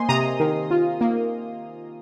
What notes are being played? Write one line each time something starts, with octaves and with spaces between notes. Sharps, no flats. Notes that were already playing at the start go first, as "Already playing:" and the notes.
Already playing: A#3 C5 D#5 G#5 C6
C3 A#5 D#6
D#3
F4
A#3